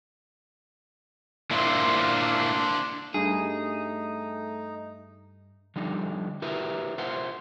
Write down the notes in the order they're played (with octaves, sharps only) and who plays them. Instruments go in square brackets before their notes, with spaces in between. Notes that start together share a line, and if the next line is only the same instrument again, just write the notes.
[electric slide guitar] A#3 E4 F4 [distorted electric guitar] D4 C5
[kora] G2 [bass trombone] A3 [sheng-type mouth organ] D#4 [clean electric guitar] G#4
[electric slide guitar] D3 F3 G3 D#4
E4 F#4 G4 A#4 B4 E5
F4 A#4 C5 E5 F#5